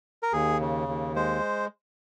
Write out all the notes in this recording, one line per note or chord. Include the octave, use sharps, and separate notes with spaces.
A#4
D#2 G#4
C#3
D#2
G#3 C5